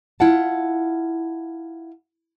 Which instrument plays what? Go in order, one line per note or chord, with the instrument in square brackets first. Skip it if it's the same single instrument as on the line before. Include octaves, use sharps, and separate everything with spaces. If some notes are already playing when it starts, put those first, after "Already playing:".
[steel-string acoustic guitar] E4 F4 F#5 A5